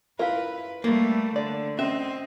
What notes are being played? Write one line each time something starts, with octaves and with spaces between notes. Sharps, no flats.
E4 F4 A#4 B4 E5 F5
G3 A3 A#3
D3 D5
C4 C#4 D#5 E5